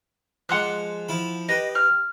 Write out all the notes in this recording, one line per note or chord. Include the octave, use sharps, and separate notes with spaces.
F3 G#3 F#5 C6 F#6
F3 E4 B5
G4 B4 D#5
F6